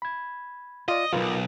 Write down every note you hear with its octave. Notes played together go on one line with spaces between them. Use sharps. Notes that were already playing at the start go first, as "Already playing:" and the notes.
B5 G#6
F4 D5 D#5
B1 E2 F4 A#4 B4